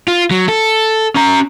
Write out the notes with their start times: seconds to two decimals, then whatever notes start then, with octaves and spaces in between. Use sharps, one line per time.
0.08 F4
0.31 F#3
0.49 A4
1.15 C#4 A#5